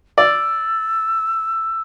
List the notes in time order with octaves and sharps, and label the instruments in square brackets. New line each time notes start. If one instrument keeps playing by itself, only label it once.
[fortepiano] D5 [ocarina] E6